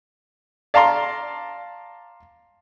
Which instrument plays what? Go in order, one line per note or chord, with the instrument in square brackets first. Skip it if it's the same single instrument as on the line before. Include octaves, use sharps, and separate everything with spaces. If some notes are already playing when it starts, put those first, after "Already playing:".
[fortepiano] D5 F5 A5 A#5 C6